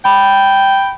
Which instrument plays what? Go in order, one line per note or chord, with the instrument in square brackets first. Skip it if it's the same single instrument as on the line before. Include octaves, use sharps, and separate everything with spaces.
[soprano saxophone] G5 [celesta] B5